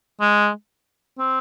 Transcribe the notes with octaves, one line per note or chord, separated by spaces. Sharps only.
G#3
C4